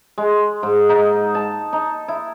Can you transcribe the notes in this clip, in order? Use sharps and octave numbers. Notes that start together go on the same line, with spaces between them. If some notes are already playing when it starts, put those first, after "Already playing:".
G#3
G#2
D#4
A5
D#4
E4